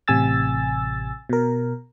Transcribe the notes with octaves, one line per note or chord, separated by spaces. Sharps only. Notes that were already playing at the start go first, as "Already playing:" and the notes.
A1 C3 G#5 E6 A6
B2 A#4